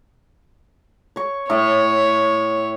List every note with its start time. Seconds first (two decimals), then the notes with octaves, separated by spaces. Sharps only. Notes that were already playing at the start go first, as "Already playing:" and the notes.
1.16 C#5 C#6
1.50 A2 C#5 E5